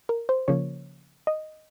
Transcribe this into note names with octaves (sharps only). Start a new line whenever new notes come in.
A#4
C5
C#3 F3 A#3 C#5
D#5